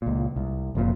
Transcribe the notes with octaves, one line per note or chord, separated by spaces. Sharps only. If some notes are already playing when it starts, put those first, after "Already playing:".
C#2 A#2
C2
F#1 F2 A#2